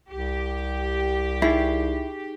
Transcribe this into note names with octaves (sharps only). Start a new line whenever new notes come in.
C2 G4
D#4 E4 G#4 C7